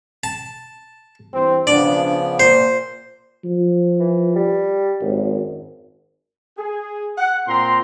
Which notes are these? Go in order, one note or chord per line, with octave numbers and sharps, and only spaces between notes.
A5
G2 E3 C4
C#3 F3 B3 D4 D5
A#2 C5
F3
E3
G3
G#1 F#2
G#4
F#5
A#2 C4 F4 A#5 C6